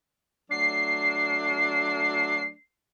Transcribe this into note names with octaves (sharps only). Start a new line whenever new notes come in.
F#3 A3 D4 C7